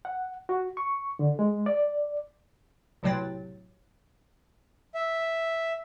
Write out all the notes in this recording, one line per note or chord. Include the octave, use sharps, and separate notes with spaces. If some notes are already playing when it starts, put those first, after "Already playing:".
F#5
F#4
C#6
D3
G#3
D5
B1 A2 C3 F#3 G5 A6
E5